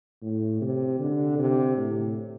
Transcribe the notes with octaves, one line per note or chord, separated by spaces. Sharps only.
A2
C3
D3
C3
A2